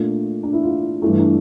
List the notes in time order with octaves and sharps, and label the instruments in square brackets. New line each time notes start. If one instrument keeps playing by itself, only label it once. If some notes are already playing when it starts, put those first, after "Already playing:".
Already playing: [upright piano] A#2 A3 D4
D4
E4
F4
G2 E3 A3
D4